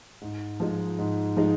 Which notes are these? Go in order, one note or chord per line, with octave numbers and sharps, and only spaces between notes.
G#2
F3 G#3 D#4
G#2
F3 G#3 D#4